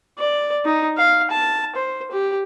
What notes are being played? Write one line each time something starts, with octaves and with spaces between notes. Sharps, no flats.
D5
D#4
F5
A5
C5
G4